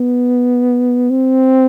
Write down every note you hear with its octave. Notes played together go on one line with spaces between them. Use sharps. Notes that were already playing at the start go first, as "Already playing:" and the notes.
Already playing: B3
C4